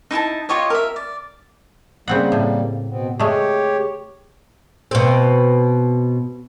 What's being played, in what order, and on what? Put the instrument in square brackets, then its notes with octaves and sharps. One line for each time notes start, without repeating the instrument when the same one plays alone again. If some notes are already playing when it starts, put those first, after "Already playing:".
[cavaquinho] D#4 E4 G#5 A5
F4 G4 C#5 D#5
A#4 E5
D5
[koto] C#3 C4 F#5 [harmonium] G3 A#3
[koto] A2
[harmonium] B2 B3 C4
[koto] G#3 A3 [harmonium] G4 C#5
[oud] B2 C4